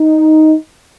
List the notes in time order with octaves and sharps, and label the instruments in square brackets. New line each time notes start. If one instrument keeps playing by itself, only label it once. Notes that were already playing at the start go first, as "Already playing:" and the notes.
Already playing: [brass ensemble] D#4